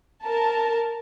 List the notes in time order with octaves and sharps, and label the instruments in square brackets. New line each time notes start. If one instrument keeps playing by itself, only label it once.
[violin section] A#4 A5